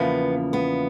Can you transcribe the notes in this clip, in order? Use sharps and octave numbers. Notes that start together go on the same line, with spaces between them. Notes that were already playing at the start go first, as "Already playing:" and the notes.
Already playing: E2 C#3 F3 A#3 B3
B3